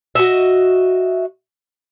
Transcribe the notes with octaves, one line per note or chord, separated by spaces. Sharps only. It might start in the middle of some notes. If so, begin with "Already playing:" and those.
F#4 D#5 E5